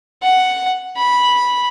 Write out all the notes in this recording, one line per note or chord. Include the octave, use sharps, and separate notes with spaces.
F#5
B5